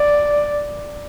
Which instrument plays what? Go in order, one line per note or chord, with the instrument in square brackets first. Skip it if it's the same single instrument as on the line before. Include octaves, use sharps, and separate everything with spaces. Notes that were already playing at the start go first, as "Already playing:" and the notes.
Already playing: [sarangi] D5